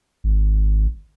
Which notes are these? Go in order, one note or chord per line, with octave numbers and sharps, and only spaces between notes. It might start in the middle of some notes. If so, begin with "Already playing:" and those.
G#1